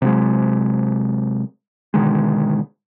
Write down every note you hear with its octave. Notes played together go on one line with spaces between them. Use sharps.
C3 F#3 G#3
B2 D3 D#3 G#3